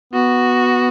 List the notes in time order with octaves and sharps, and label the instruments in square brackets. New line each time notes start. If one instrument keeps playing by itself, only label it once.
[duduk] B3 [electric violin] F#4